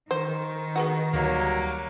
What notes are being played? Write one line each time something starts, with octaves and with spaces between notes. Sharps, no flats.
D#3 C5
G#3 B3 F#4
D2 F#3 G3 A#3